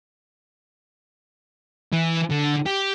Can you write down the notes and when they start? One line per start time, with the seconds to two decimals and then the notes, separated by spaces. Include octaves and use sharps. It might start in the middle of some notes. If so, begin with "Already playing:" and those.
1.92 E3
2.31 D3
2.66 G4